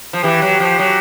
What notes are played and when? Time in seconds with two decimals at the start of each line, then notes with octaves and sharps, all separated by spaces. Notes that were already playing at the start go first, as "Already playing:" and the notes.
0.13 F3
0.23 E3 G4
0.42 F#3
0.60 F3
0.79 F#3